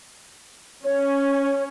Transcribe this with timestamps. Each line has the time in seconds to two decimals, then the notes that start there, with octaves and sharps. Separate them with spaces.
0.85 C#4 C#5